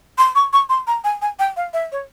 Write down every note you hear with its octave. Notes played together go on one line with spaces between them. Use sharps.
C6
C#6
C#6
C6
A#5
G#5
G#5
G5
F5
E5
C#5